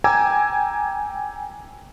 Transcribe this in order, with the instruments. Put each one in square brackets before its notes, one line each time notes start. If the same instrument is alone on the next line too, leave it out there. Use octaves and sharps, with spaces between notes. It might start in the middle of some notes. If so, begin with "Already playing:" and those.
[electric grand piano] G5 G#5 A#5 D6 E6 G#6